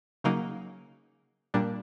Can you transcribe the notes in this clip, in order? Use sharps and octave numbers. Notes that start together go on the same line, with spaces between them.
C#3 F#3 A#3 D#4
A#2 G3 A#3 D4